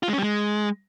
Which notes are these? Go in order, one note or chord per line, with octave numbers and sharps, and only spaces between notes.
F4
G#3
C#4
G3
G#3